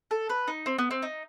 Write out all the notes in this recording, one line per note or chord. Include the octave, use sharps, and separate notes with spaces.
A4
B4
D#4
C4
B3
C4
D#4